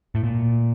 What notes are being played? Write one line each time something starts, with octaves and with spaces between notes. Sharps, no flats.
A2
A#2